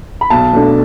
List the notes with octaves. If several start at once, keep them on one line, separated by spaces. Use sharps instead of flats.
B5
B1 A5
B2 A3 D4